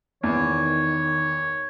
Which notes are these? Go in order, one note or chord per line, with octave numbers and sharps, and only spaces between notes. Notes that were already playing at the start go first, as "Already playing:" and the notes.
E2 D#3 C#5